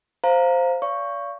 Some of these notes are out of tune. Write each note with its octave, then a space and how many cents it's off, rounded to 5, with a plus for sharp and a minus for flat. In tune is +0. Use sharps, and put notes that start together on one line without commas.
C5 +0 F5 +0 A#5 -5
D5 -35 F5 -20 C#6 +0